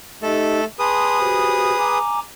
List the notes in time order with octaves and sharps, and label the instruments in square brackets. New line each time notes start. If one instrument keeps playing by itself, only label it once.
[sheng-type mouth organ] A3 A4 A5 [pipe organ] D#4 G4 D#5
[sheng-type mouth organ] G#4 B4 D#6 [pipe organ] A5 C6
[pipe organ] F#4 G4 C5
G#5 A#5 D6